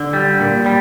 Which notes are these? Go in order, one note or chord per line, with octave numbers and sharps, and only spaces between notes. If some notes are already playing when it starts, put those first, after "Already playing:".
Already playing: D3
G3
A#2
G3